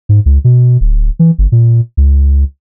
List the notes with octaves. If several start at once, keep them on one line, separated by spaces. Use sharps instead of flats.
G#2
C#2
B2
D1
E3
G1
A#2
C#2